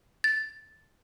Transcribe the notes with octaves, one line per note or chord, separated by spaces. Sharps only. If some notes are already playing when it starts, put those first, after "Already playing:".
A6